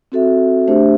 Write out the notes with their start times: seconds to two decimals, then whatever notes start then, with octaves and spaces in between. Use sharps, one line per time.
0.12 C4 F#4 A4 E5
0.67 A3 D4 G4 C5 E5